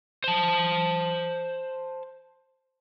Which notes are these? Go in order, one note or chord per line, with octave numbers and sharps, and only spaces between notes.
C5 A5